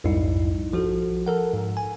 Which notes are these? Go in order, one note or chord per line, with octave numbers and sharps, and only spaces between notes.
B1 F2 G#2 G3 D#4 E4
A#1 F3 F#4 A4
A4 A#4 F#5
G#2
G#5